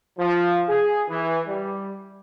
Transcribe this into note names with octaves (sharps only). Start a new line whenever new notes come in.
F3
G#4
E3
G3